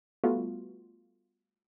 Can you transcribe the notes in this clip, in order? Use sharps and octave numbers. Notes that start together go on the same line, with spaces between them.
G3 A3 B3 F4 F#4